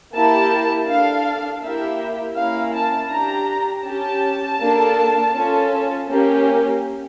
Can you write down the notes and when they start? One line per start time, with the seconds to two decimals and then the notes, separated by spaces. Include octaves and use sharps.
0.14 A#3 E4 G4 A5
0.88 D4 A4 F5
1.62 A#3 E4 G4 E5
2.36 A#3 C#4 E4 F5
2.73 A5
3.10 D4 G4 A#5
3.86 C#4 G4 A5
4.59 A#3 D4 A4
5.34 C#4 F4 A4
6.09 A#3 C#4 G4